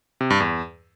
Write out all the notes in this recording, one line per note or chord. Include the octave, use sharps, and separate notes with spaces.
C3
G2
E2